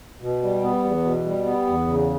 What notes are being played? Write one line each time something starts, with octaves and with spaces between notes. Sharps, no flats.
B2
G3
B3
E2
B2
G3
B3
E2
C#3